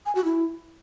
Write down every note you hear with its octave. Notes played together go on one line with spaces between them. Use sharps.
G#5
F#4
E4